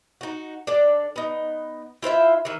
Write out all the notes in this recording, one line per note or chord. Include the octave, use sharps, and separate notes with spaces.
D#4 F#4
D4 A4 D5
B3 D#4
E4 F4 C5 E5
D#3 E3